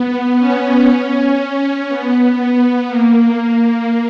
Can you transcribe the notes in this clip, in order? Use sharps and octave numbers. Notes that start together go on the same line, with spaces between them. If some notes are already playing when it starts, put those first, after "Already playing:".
Already playing: B3
C#4
B3
B3
A#3